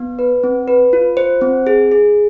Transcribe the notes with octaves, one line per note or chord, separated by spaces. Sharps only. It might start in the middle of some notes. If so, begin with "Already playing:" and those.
Already playing: B3
B4
C4
B4
F4
C5
C4
G#4
G#4